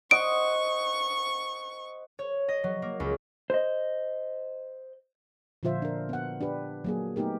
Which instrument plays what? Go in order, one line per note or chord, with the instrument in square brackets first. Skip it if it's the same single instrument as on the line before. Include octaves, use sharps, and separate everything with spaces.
[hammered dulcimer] C5 D#5 F#5 [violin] C#6 [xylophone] D7
[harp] C#5
D#5
F#3
A#3
C#2
[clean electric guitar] C5 D#5
[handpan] A#2 D3 F3 F4 C5 E5
D4 A#4
B3 F#5
D4 G4 B4
F#3 A#3 G#4
A3 B3 D#4 G4 A#4